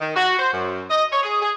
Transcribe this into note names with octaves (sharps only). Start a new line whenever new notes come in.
D#3
F#4
C5
F#2
D#5
C#5
G#4
G#4